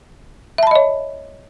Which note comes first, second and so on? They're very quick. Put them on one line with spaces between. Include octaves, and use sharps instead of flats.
E5 A5 B5 D#5 C#5